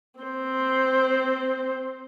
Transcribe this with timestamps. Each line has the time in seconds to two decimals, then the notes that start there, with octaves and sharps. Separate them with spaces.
0.20 C4 C5